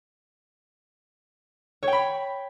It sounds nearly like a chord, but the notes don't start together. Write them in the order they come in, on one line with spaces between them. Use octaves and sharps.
C#5 G5 B5